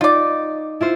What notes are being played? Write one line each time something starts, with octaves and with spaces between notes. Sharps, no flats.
D#4 F4 D5
E4 F4 C5